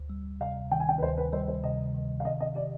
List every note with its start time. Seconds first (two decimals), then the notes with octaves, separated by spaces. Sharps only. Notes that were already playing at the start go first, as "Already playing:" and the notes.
Already playing: D2
0.10 G3
0.40 C3 F5
0.71 D#3 G5
0.80 G#5
0.89 G5
0.98 B4
1.02 D2 C5
1.18 B4
1.33 G3 C5
1.48 C5
1.64 C3 D#5
1.94 D#3
2.20 F5
2.24 D#3 D#5
2.40 D#5
2.55 G4 D5